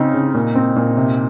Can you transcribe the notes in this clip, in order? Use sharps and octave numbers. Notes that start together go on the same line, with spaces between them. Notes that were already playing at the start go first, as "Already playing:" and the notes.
Already playing: C#3 C4 D#4
C#3
A#2
C4
A#2
C3